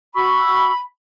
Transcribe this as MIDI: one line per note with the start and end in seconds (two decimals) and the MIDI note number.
0.15 0.70 66
0.15 0.80 83
0.15 0.70 85
0.15 0.70 88